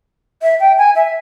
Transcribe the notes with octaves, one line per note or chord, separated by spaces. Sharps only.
E5
G5
G#5
E5